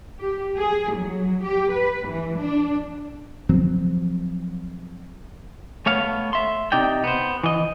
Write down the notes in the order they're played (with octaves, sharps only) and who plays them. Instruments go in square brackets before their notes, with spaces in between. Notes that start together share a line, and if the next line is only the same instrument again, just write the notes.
[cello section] G4
G#4
F#3
G4
B4
E3
D4
[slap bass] F3 F#3 C4
[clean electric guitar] A3 B3 C#5 F5
E5 C6
C3 D#4 D5 G5
B3 C5
E3 D#5